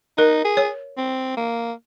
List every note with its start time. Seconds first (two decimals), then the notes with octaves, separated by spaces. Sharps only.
0.18 D#4 A#4
0.45 G#4
0.57 C#5
0.98 C4
1.37 A#3